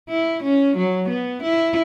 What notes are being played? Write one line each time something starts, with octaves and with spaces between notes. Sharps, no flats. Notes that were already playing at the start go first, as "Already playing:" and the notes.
E4
C#4
F#3
B3
E4